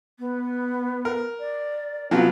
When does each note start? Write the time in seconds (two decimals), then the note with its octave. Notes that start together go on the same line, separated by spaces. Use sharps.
0.19 B3
1.05 A#4
1.40 D5
2.11 C3 F3 F#3 B3